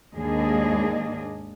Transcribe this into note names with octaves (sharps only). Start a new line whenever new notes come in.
D#2 G#2 A#3 D4 G#4 D#5